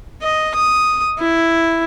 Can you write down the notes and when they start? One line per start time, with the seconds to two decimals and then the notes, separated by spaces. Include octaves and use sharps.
0.22 D#5
0.55 D#6
1.19 E4